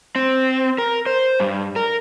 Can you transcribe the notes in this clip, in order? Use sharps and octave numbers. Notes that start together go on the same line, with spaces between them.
C4
A#4
C5
G2
A#4